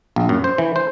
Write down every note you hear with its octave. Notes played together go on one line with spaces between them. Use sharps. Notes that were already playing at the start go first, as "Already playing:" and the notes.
A#1
F#2
C5
E3
C5